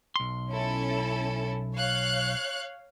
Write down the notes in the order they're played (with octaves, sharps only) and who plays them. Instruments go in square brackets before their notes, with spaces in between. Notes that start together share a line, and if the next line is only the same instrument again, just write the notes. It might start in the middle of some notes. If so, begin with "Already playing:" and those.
[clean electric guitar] B1 C6
[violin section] C#4 E4 A4
C#5 F5 F#6